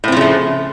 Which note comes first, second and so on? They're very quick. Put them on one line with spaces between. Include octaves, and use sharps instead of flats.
A2 C4 F3 C#3 A3